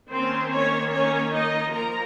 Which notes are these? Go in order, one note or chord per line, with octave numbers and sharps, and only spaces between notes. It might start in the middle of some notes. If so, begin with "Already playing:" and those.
D#3 A#3 C4 C#4 C5
C#4 C#5
C#4 C#5
D#4 D#5
F3 A#3 A#4 A#5